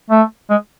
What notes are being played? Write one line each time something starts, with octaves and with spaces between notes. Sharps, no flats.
A3
G#3